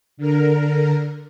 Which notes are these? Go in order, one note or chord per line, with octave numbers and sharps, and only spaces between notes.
D3 A#4